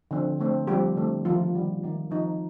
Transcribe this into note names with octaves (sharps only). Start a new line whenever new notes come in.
D3 F3 C4
D3 A3 C4
F3 G3 C4 G4
D3 A3 C4
D#3 F3 A#3 F4
D#3 G3 A#3
D#3 A#3
F3 C4 D#4